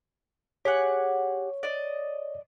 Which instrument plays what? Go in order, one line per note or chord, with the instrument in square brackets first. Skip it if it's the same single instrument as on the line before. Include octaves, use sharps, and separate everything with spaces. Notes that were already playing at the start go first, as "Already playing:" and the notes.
[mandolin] G4 G#4 F#5 [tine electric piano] C#5
[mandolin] D5 D#5